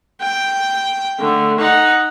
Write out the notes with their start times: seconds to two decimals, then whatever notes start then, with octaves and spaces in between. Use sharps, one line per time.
0.21 G5
1.20 D3 A3
1.58 D#4 F#5